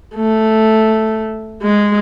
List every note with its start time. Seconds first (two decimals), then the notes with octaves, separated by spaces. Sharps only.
0.16 A3
1.62 G#3